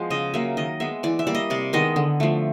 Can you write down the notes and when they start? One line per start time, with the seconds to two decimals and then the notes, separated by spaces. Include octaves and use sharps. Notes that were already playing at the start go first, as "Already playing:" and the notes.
Already playing: F3 G#3 B3
0.10 C#3 D#5
0.34 F#3 A#3 E5
0.57 D#3 D#5
0.80 G#3 B3 E5
1.03 E3 D5
1.19 E5
1.27 G3 A#3 D5
1.35 D#5
1.50 C3 D5
1.73 D#3 G#3 B3 D#5
1.96 D3
2.20 F3 A3